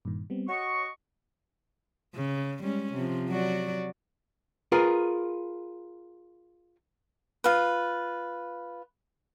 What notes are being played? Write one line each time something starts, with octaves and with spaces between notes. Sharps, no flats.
G2 A#2 D#3
G3 B3 C4
F#4 C#5 D#5 C#6
C#3
G3 G#3 C#4
C3 F3
F#3 F#4 D5
F4 G#4 A#4 B4
F4 B4